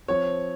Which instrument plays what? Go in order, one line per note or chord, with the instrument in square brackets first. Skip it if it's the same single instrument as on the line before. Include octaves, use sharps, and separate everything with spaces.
[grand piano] F3 C4 C#5